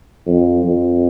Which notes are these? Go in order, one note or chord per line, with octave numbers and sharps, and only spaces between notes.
F2
F2